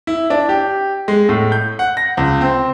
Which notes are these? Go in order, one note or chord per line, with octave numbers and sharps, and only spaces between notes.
E4
D4
G4
G#3
A2
G6
F#5
A#6
C#2
C4